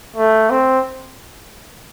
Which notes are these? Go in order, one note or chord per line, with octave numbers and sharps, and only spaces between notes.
A3
C4